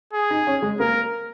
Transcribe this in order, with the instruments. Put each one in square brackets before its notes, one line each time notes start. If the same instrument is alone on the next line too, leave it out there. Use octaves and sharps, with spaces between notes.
[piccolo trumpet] G#4
[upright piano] D#4
C#4
G#3
[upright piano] A#3 [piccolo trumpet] A#4